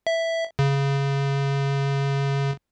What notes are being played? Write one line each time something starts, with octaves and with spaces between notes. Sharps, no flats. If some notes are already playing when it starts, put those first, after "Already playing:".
E5
C#3